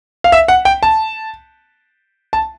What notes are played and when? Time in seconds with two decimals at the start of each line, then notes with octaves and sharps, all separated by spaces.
0.24 F5
0.32 E5
0.48 F#5
0.65 G5
0.83 A5
2.33 A5